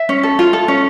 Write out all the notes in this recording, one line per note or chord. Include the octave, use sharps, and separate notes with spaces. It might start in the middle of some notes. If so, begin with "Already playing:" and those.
Already playing: E5
C#4
A4
F4
A4
C#4